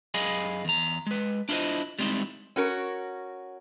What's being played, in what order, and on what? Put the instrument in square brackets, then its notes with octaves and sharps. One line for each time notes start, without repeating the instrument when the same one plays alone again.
[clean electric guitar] F#2 G#4 D#5 F5 G#5 B5
E2 A#5
G#3 B4
D4 E4 F4 B4 C5 D#5
G3 G#3 C4 D#4 E4
[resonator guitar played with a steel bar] C#4 F#4 A#4